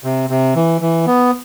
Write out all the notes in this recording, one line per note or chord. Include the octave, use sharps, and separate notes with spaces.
C3
C3
E3
E3
B3